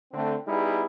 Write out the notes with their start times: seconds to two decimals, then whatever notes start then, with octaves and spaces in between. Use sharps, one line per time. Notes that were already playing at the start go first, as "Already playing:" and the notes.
0.13 D3 A3 C4
0.48 G3 B3 D#4 E4 G#4